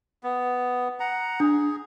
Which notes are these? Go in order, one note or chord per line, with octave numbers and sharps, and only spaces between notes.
B3
F#5 A#5
D4 G#4